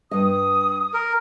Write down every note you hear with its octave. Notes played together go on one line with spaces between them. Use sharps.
G2 D#5 D#6
A#4